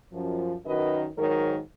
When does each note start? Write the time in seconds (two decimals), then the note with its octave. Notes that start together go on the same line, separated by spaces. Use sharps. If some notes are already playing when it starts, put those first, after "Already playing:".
0.12 F#2 F3
0.64 F#2 D#3 F#3 B4 D#5
1.16 G#2 D#3 F#3 A#4 C#5